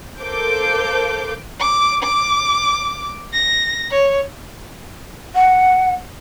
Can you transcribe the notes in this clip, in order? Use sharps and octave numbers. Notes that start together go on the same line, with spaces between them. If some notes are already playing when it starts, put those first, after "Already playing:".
A4 A#4 C5 F5 D6 G6
D6
D6
A#6
C#5
F#5